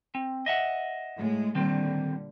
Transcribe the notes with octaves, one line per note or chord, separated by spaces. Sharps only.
C4
D#5 E5 F#5
A2 G#3
A#2 D3 D#3 G3 C4